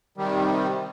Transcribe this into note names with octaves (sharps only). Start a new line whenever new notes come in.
C3 D#3 G3